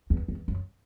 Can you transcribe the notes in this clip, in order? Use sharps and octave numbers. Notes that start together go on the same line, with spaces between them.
E2
E2
F#2